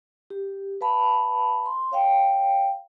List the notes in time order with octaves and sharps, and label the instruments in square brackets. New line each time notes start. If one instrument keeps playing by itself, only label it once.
[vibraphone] G4
B4 F5 A5 B5
C6
C#5 F5 G5